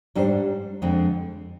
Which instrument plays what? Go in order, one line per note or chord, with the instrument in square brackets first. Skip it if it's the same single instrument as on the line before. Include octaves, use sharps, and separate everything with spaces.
[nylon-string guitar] G#2 G3 D4 G#4 C5
F2 D3 G#3 C4